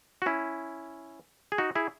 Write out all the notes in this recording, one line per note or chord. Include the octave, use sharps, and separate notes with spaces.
F#4
C#4 E4
G#4
D#4 F#4
E4 G#4